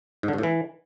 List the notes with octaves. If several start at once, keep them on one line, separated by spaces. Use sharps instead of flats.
G#2
D3
G2
A2
E3